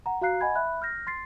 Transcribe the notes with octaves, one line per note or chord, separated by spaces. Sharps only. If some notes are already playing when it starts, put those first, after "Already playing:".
F#5 A#5
F#4 F5 A#5 F#6 C7
D#5 F#5 G#5 B5 G#6
E5 B5 F#6
F6 G6 A#6
C6 A6 C7